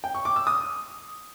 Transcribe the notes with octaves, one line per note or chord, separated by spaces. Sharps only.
G5
C#6
D6
E6
D#6